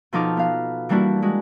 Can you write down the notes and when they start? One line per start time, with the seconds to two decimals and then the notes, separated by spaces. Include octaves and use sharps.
0.13 B2 F3 D#4 A4 D6 F6
0.37 B3 F5
0.89 E3 G3 A#3 D4 E4 F#4
1.22 G#3 F#4